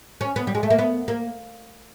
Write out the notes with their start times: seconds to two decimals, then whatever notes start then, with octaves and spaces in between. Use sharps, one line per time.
0.21 C#4
0.36 B3
0.47 G3
0.55 G#3
0.63 A3
0.70 A#3
0.79 B3
1.08 A#3